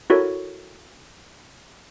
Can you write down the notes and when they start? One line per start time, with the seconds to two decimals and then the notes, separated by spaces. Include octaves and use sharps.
0.10 E4 F#4 A4 A#4 C#5